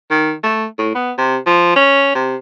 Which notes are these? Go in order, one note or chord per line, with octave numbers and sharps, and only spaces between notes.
D#3
A3
A2
B3
C3
F3
C#4
C3